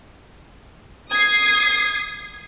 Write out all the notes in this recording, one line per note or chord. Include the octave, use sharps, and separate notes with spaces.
D#6 G#6 C7